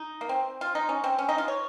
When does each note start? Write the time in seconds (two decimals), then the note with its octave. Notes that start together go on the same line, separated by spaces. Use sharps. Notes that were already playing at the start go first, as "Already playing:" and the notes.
Already playing: D#4
0.21 A#3
0.29 C4
0.61 F4
0.75 D#4
0.89 C#4
1.04 C4
1.18 C#4
1.29 D#4
1.38 F4
1.48 C#5